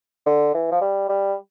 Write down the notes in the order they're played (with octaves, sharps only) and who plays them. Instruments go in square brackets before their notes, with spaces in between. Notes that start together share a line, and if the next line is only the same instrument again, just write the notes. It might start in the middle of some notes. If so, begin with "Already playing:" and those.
[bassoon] D3
E3
F3
G3
G3